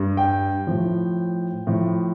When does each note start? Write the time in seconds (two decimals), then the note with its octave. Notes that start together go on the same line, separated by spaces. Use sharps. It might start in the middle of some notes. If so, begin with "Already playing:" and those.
Already playing: G2 G3
0.17 G5
0.67 A2 F3
1.67 A2 F3